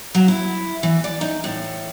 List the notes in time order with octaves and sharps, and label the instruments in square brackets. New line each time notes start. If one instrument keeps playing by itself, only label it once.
[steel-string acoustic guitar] F#3
E4
E3
D5
D#4
A2